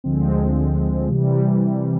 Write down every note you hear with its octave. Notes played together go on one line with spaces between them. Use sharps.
D2 D3 F3 G#3 C4
C3 E3 G3